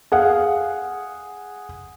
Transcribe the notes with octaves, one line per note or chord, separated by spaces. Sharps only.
G#4 F5 F#5